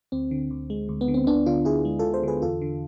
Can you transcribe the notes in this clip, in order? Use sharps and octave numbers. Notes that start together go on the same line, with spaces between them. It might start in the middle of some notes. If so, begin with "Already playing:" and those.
D2 C4
D3
D2
G#3
D2
B3
D3
C4
D2 B3 D4
D3 D4 F4
D2 E4 G#4
G#3
D2 F4 A4
A4 C5
D3 G#4 B4
E2 F4 A4
D3